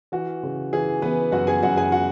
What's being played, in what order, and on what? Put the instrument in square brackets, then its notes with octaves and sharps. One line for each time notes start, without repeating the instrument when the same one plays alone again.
[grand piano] E3 F#4
C#3
E3 G#4
E3 B3 B4
F#2 F#4 F#5
G#4 G#5
F#2 F#4 F#5
G#4 G#5
F#4 F#5